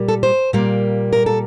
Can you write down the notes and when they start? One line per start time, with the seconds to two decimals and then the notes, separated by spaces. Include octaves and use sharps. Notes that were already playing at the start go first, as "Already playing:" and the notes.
Already playing: A#2 G3 A#3
0.08 A4
0.23 C5
0.53 A#2 G3 A#3
1.13 A#4
1.26 A4